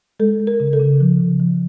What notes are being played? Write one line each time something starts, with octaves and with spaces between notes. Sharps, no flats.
G#3 A4
G#3
A#4
C#3
A4
C#3
F3
C#3
F3